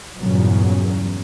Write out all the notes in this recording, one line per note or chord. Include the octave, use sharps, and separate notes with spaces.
E2 G2 A#2 C#3 F#3